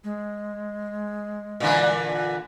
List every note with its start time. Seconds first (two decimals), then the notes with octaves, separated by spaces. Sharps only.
0.04 G#3
1.60 A#2 D3 E3